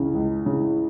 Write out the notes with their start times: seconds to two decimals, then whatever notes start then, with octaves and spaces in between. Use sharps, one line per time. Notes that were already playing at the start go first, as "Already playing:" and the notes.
Already playing: C#2 C#3 E3 C#4
0.14 C#2
0.46 C#3 E3